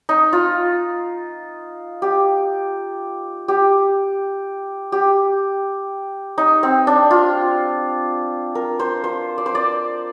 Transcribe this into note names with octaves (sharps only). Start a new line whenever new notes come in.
D#4
F4
G4
G4
G4
D#4
C4
D4
F4
A#4
C5
C5
D5
C5
D5